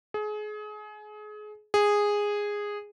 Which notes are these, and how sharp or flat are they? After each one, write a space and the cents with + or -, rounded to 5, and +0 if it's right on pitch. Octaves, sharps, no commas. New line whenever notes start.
G#4 +30
G#4 -10